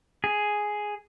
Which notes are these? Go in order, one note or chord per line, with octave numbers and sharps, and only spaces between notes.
G#4